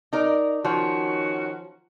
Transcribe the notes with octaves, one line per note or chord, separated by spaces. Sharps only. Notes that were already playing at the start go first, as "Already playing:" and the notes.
D#4 A#4 D5
D#3 F3 C#4 F#4 C#5